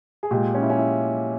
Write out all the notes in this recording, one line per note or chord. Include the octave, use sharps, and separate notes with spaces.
G#4
A#2 G#3 G4
C#4
E4
C#4
E4